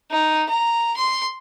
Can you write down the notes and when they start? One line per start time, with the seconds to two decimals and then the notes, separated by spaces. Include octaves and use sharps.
0.10 D#4
0.48 A#5
0.96 C6